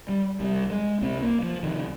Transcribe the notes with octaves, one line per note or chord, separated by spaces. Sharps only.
G3
C2 C3 G3
G#3
C2 C3 C4
A#3
F3
C2 C3 D#3